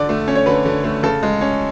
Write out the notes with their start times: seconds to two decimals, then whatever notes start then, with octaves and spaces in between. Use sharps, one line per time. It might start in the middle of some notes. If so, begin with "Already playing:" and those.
Already playing: D3 D5
0.09 A3
0.28 C#4
0.36 C#5
0.46 D3 B4
0.65 D3
0.84 A3
1.03 C#3 A4
1.23 G#3
1.41 C#4